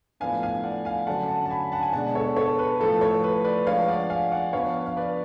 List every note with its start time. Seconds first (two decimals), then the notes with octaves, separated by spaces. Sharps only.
0.20 A2 F3 B3 D4 F5 G#5
0.43 F5 G#5
0.63 D5 F#5
0.85 F5 G#5
1.07 D3 F#3 C#4 F#5 A5
1.28 F#5 A5
1.46 A5
1.50 G#5 B5
1.72 F#5 A5
1.82 G#5
1.93 B2 G#3 D4 F#5 A5
2.15 A4 C#5
2.36 A4 C#5
2.59 B4
2.80 A2 F3 A3 A4
3.01 A4 C#5
3.24 B4
3.45 B4 D5
3.67 F3 G#3 D4 C#5 F5
3.88 D5 F#5
4.10 F5 G#5
4.32 D5 F#5
4.53 F3 B3 D4 C#5 F5
4.86 F5
4.96 B4 D5